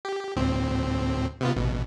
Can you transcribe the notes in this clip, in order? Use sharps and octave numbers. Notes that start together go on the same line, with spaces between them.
G4
D2 A2 C4
C3 B3 F4
A1 B2